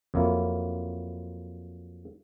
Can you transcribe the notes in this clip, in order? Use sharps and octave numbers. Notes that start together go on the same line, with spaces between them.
F2 F#3 A#3 E4